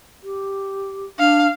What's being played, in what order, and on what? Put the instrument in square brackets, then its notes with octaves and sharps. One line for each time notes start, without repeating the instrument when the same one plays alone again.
[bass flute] G4
[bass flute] D4 [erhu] F5